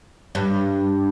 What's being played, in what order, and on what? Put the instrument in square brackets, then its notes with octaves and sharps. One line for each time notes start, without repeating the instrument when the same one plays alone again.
[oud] G2